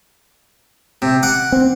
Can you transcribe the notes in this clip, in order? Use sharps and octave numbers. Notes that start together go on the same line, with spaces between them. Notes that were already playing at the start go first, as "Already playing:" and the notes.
C3
F#5 D6
C4